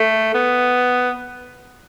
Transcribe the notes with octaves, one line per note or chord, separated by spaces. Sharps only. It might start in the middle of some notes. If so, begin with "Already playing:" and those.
Already playing: A3
B3